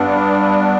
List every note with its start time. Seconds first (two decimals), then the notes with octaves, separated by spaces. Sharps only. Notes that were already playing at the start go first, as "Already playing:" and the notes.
Already playing: G2 B3 D4